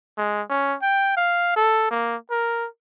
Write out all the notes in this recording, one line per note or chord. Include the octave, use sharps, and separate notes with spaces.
G#3
C#4
G5
F5
A4
A#3
A#4